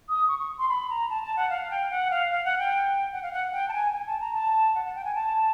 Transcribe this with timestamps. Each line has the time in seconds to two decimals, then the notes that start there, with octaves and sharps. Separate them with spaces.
0.09 D#6
0.28 C#6
0.39 C#6
0.59 C6
0.69 B5
0.90 A#5
1.10 A5
1.23 A5
1.36 F#5
1.50 F5
1.71 G5
1.90 F#5
2.11 F5
2.31 F5
2.45 F#5
2.59 G5
3.12 F#5
3.23 F5
3.33 F#5
3.53 G5
3.68 A5
3.74 G#5
3.93 G#5
4.07 A5
4.21 A#5
4.34 A5
4.75 F#5
4.85 F#5
4.95 G5
5.05 G#5
5.15 A5